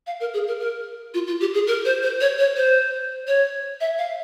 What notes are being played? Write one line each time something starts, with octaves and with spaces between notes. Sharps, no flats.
F5
A#4
G#4
A#4
A#4
F4
F4
G4
G#4
A#4
C5
C5
C#5
C#5
C5
C#5
E5
F5